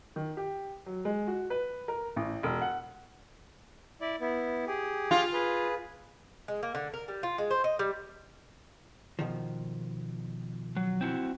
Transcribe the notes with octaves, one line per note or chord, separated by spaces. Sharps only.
D#3
G4
F#3
G#3
F#4
B4
A#4
A1
E1
F#5
E4 D5
B3 E4
G4 G#4
F4
G#4 B4
G#3
A#3
D3
A#4
G3
F4
G#3
C5
D#5
G3
B2 D#3 F3
F#3
C4 E4 F#4